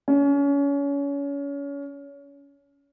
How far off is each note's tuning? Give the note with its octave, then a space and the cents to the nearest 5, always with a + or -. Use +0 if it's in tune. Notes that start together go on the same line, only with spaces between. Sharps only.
C#4 +30